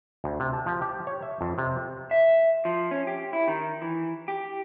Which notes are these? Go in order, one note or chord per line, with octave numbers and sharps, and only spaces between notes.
D2
C3
A5
F3
G4
C#5
E5
F2
C3
E5
F3
C#4
G4
E4
D#3
E3
G4